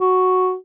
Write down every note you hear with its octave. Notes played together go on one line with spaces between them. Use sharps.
F#4